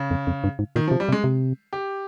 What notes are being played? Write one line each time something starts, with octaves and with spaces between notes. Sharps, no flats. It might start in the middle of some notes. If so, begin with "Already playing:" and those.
Already playing: C#3
F2
F2
G2
G#2
A#2 D#3
F3
C3
G3
C3
G#3
C3
G4